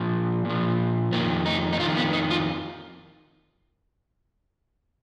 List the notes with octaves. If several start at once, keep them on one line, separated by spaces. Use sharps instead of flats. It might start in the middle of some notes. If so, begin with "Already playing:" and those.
Already playing: A#2 F3
A#2 F3
F2 D#3 A#3
D#4
D#4
F2 D#3 F4
B3
D#4
F4